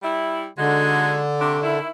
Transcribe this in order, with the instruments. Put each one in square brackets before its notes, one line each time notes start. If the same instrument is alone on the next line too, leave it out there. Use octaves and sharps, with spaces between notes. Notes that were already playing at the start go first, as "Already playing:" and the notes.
[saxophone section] G3 E4
[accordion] D3 [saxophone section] G#3 D#4 F#4
[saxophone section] C3 A3 D4
D#3 E4